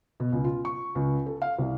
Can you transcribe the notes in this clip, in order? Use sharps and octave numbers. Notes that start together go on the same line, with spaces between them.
B2
C#2
F4
C#6
C#2
A4
F5
C2